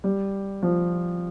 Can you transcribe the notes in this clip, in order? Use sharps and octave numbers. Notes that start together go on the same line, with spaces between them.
G3
F3